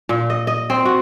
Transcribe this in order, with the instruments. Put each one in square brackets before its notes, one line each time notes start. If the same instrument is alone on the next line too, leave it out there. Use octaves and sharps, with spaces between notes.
[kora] A#2
D#5
D#5
C4
F#4